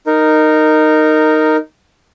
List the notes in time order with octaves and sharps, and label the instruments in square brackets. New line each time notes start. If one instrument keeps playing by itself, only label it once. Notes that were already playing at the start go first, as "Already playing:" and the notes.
[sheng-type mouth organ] D#4 A#4